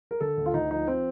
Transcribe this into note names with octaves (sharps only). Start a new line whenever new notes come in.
A#4
D3 A4
D2
F4
D2 D#4
F3 D#4
F3 C4